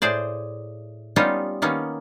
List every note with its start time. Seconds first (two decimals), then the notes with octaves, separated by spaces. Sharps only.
0.02 A2 G#4 C5 D5
1.16 G3 B3 C#4 D#4 F4 D#5
1.62 D#3 A#3 B3 C#4